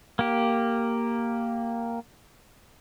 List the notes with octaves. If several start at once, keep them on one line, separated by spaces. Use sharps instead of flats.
A#3 G4